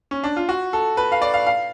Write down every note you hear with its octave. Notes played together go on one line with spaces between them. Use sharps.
C#4
D4
F4
F#4
A4
B4
F5
D5
F5
F5